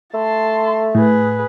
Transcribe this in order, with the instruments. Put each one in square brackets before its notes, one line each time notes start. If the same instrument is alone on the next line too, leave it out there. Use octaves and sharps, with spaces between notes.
[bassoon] A3 [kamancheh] A5 C6
[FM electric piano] A2 [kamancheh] G#4 B4